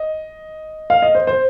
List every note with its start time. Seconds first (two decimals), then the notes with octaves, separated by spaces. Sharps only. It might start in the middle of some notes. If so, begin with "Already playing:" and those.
Already playing: D#5
0.90 F5
1.02 D#5
1.15 C5
1.27 C5